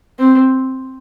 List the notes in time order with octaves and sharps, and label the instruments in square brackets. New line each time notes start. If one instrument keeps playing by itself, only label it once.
[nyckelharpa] C4